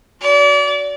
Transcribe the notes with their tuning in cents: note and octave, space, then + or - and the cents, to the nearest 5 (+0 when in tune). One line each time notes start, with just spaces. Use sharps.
F#4 +0 D5 -35